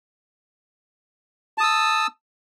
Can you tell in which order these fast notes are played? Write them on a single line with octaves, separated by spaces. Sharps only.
A5 D#6 E6